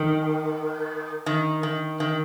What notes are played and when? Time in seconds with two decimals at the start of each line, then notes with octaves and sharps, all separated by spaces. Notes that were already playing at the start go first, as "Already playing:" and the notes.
Already playing: D#3
1.26 D#3
1.63 D#3
2.00 D#3